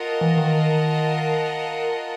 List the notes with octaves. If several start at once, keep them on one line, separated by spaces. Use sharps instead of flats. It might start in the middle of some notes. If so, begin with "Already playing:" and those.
Already playing: F4 A#4 D#5 F#5 A5
E3
D#3